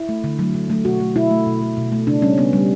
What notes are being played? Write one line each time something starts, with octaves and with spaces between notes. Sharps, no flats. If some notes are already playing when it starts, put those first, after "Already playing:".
Already playing: E4
A3
D3
F#3 A3
D3
F#3 A3
B2 F#4
A3
B2 E4
A3
B2
A3
B2
A3
C#3 D4
G3 C#4
C#3 B3
G3